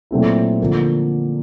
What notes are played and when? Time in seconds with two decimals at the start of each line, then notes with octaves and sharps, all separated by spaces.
0.11 A#2 F#3 A3 C4 E4
0.60 D3 F3 A#3